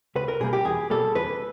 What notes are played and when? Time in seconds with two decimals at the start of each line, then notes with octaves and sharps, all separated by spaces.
0.16 C#2 B4
0.28 A#4
0.40 B2 G3 A#3 G#4
0.53 G4
0.65 E2 G#4
0.90 B2 G3 A#3 A4
1.15 E2 B4